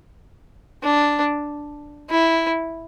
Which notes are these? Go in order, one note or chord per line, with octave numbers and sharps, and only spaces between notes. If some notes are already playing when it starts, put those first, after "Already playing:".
D4
E4